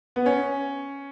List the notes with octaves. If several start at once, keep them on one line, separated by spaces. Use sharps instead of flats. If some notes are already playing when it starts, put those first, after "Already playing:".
B3
C#4